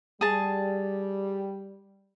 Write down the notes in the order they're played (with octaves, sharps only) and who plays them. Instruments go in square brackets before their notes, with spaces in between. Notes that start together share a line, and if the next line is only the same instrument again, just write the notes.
[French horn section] G3 [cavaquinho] G#4 A5